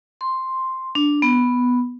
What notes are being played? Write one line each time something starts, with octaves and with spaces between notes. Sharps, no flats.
C6
D4
B3